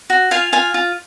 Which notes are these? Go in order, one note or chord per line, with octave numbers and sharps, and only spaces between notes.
F#4
F4 F5 G#5
F4 F5 G#5
F4